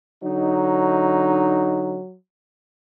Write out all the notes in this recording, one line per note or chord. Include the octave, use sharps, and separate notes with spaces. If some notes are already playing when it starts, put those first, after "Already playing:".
D3 F#3 D#4